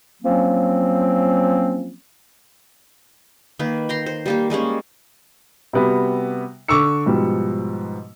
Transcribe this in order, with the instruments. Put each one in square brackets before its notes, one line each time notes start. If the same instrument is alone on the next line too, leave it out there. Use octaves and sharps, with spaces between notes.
[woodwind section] F3 F#3 A#3 C4 C#4
[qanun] D#3 A#3 B4
G5 A#5 C6
C5
G3 A#3 G4
G3 G#3 A#3 C#4
[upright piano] C3 G3 B3 F#4
D3 C#6 D6 E6 C#7
G#2 B2 F3 G3